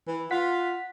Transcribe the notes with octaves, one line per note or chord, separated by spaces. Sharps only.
E3
F4 F#5 B6